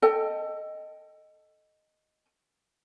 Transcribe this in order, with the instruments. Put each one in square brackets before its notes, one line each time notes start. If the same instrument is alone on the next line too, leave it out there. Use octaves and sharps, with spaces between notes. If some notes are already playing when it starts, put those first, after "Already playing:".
[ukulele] A4 D#5 G5